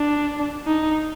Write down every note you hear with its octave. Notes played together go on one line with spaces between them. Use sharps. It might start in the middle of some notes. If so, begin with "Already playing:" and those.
Already playing: D4
D#4